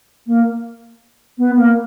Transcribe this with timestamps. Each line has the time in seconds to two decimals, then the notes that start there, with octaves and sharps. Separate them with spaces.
0.27 A#3
1.38 B3
1.56 A#3